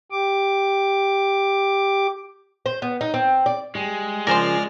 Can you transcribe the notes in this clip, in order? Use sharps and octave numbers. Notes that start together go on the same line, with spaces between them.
G4 D6
C5
B3
D#4
C4
D5
G3 G#3
C#3 F3 A#4 C5 D5 G#5 C6 F6